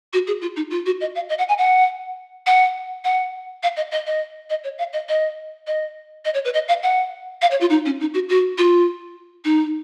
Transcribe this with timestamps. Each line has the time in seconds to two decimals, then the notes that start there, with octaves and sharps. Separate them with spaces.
0.13 F#4
0.27 G#4
0.41 F4
0.56 D#4
0.70 F4
0.86 F#4
1.01 D#5
1.15 F5
1.29 D#5
1.38 F#5
1.49 G#5
1.58 F#5
2.46 F#5
3.04 F#5
3.63 F5
3.77 D#5
3.91 D#5
4.07 D#5
4.50 D#5
4.64 C#5
4.78 F5
4.93 D#5
5.09 D#5
5.67 D#5
6.25 D#5
6.34 C#5
6.45 B4
6.54 D#5
6.68 F5
6.83 F#5
7.42 F5
7.51 C#5
7.61 F4
7.70 D#4
7.86 C#4
8.00 D#4
8.14 F#4
8.29 F#4
8.58 F4
9.45 D#4